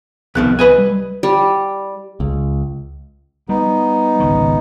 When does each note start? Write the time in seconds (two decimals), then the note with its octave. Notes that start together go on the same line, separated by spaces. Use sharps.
0.35 C2 F2 B2 D#3 F#6
0.59 B4 D#5 G#5
0.78 G3
1.23 G3
2.20 C#2
3.49 G3 B3 D#4
4.20 G#1 C#2 D#3